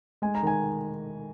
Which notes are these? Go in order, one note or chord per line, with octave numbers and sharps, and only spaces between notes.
G#3 G#5
A#5
D#3 G#5